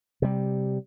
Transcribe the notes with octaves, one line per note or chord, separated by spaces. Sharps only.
C3 G3